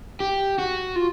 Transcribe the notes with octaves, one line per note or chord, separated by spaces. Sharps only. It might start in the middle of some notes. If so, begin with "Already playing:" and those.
G4
F#4
F4